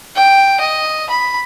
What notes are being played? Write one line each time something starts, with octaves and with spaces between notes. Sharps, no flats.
G5
D#5
B5